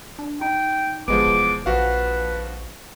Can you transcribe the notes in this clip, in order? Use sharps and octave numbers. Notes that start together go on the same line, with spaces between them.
D4
D#4 G5
G1 F3 G#3 B3 D6
E1
A#1 F3 F#4 B4 F5